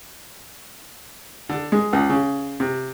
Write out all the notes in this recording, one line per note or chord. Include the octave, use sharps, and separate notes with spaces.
D3
G#3
C#2
C#3
C3